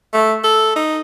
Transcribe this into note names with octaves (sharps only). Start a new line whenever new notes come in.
A3
A4
D#4